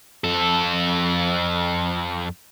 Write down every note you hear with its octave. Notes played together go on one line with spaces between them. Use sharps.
F2 A4